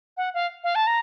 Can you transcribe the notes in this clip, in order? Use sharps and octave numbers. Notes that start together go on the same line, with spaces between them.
F#5
F5
F5
A5
A#5